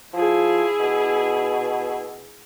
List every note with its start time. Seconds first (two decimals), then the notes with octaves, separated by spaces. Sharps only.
0.14 F3 E4 G#4
0.79 B2